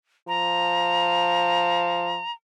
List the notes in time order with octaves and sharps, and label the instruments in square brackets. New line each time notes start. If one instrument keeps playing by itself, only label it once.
[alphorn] F3 [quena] A#5